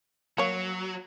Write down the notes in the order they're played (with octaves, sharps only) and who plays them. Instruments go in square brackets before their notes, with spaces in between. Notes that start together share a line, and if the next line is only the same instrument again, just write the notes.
[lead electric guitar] F#3 [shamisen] A#3 C#5